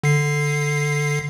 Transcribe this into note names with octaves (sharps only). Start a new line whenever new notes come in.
D3 C7